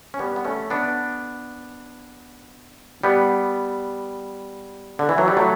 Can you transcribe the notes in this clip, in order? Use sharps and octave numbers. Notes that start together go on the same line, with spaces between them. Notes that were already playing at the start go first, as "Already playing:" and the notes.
C#4
G3 B3
B3
A3 C#4
B3 D4
G3 B3
D3
E3
F#3
G3
F#3 A3